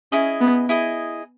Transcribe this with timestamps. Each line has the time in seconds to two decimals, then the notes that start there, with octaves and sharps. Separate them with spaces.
0.12 C#4 E4 G#4 D#5
0.41 B3
0.69 E4 G#4 D#5